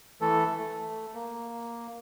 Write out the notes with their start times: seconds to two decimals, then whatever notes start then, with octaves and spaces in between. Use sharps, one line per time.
0.21 E3 A3 A4
0.58 A3
1.14 A#3